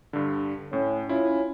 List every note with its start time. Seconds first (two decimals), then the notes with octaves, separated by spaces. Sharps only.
0.13 G2 D3
0.73 A2 C#4
1.09 C#4 E4 F4